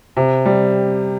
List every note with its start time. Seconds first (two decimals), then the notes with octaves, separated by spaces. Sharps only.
0.17 C3
0.46 G3